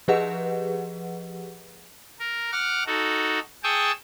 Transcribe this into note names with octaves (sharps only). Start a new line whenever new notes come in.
F3 G4 G#4 B4 D#5 F#5
A#4
F#5 D6 F6
D#4 F#4 A4
G#4 G5 A5 C#6 D#6 E6